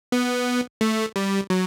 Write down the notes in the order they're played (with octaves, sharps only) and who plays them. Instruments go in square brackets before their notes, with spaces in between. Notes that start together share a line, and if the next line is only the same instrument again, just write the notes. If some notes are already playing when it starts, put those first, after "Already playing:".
[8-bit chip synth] B3
A3
G3
F#3